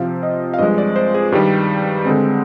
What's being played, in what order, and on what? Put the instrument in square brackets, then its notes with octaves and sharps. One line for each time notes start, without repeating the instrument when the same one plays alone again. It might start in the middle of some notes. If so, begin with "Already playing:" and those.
Already playing: [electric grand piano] C3 F3 C4 F5
D#5
F5
G2 F3 G#3 D#5
D5
C5
G#4
G2 D#3 G3 G4
D3 G#3 C4